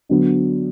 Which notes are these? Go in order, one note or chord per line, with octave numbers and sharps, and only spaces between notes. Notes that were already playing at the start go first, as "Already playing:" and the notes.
D3 F#3 B3